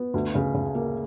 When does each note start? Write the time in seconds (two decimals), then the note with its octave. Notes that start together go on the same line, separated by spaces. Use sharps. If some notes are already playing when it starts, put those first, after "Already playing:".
Already playing: B3
0.14 D2
0.35 C#3
0.54 C#3
0.75 A#3